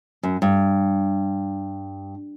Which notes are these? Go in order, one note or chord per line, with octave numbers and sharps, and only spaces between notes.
F#2
G2